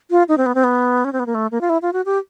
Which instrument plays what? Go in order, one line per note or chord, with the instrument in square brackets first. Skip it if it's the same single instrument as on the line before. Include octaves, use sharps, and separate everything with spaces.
[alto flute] F4
D#4
C4
B3
C4
B3
C#4
C4
B3
A#3
A3
A#3
F4
E4
F4
F#4
G4